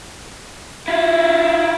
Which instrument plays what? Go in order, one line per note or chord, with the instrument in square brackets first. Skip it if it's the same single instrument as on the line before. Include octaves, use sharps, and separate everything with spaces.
[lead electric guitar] E4 F4